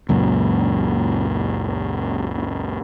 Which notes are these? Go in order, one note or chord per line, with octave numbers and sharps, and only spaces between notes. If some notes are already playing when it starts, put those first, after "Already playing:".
C#2 F#2 A#2